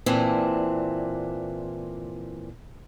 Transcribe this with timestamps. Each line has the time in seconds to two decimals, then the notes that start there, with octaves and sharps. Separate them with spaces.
0.06 A#2 E3 C4 D4